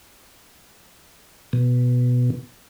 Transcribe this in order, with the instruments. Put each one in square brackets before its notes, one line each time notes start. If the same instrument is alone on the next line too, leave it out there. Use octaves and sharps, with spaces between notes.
[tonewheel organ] B2